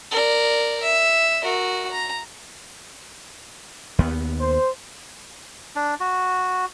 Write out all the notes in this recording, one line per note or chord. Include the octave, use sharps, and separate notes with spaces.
A#4 D5
E5
F#4 A#4
A#5
D#2 B3
C5
D4
F#4